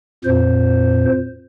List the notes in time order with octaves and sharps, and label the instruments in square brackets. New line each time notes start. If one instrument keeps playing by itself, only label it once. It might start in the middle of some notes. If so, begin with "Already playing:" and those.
[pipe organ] F2 A#2 C5